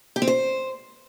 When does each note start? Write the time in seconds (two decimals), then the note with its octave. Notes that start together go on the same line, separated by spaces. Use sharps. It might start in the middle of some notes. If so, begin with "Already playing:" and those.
0.16 G4
0.22 C4
0.28 C5